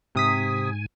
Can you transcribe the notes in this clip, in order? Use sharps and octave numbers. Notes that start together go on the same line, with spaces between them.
G#2 C3 G#5 D#6 B6